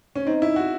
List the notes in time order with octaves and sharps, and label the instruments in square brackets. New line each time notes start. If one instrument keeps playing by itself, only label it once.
[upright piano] C#4
[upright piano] C4 [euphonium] D#4
[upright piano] E4
F#4